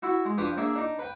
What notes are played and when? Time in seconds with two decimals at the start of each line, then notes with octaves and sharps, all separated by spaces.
0.03 E4 F#4
0.25 G#3
0.38 G2 F3 G4 B4 D#6
0.57 A#3 D4 G#4 E5
0.75 D4 D#4
0.99 B4 G5